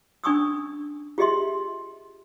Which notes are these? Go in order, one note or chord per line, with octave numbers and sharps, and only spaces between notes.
C#4 D4 G#5 C#6 D#6 E6
F4 G4 G#4 D#5 E5 C6